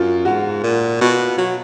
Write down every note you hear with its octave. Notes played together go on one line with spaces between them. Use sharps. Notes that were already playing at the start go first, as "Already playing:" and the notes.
Already playing: F#2 F4
G#2 F#4
A#2
B2
F#3